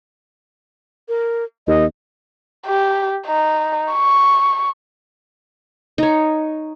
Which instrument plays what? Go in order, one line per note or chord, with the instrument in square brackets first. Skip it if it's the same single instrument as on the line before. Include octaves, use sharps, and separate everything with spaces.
[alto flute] A#4
[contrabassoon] D#2 [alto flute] D#5
[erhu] G4
D#4
C#6
[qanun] D#4 C#5